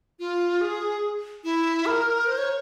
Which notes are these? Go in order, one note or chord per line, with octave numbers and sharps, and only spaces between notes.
F4
G#4
E4
A#4
C5
C#5